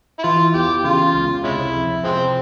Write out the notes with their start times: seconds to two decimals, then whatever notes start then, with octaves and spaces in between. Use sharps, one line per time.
0.19 E4
0.24 E3 F4
0.54 E2 G4
0.84 C#3 F4
1.14 C#2
1.44 C3 G#3 C#4 E4
1.74 F2
2.04 C3 F3 G#3 C4